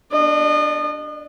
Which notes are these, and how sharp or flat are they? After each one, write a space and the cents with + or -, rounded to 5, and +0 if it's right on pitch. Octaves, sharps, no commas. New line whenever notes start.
D4 +0 D#5 -35